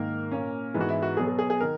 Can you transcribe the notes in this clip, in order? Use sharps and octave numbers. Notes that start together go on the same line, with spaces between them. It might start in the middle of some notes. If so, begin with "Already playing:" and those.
Already playing: G#2 D#3 A#3 A#4
A#2 A#3 C#4
G#2 E3 G#3 B3
F#4
E4
F#4
B2 F#3 B3 G#4
G#4
G#4
G#4
D#3 A#4